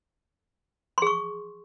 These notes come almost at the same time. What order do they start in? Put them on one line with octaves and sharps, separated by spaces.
C6 G#4 C#6